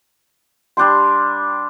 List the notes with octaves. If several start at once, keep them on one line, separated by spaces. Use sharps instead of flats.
G3 D4 G4 C6